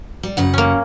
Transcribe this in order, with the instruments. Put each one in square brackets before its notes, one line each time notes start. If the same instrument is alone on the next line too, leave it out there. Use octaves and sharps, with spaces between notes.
[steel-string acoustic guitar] G3
F#2 C#3 F#5
[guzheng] A#3 C#4